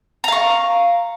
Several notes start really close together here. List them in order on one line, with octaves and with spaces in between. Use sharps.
A#5 F5 C#6